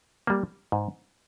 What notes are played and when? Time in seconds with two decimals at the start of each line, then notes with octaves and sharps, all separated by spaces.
0.27 G3 A#3
0.72 G#2